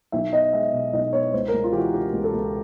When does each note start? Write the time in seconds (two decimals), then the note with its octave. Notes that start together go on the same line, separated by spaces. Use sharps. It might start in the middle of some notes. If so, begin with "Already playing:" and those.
0.12 B1 E5
0.33 B3 D#5
0.53 G#3 E5
0.73 B2
0.93 B1 D#5
1.13 B3 C#5
1.33 C#2 C5
1.48 A#4
1.54 C#2
1.64 F4
1.73 E3 G4
1.78 F#4
1.94 C#3 G4
2.13 C#2
2.24 A4
2.34 C#2